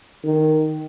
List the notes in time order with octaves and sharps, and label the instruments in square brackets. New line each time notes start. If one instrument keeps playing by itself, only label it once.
[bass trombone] D#3